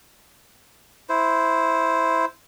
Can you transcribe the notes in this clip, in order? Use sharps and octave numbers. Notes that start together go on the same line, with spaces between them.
E4 C5